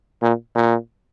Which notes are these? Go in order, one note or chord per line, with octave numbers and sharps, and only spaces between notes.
A#2
A#2